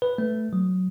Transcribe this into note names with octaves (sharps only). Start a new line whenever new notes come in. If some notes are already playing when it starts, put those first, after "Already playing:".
B4
A3
F#3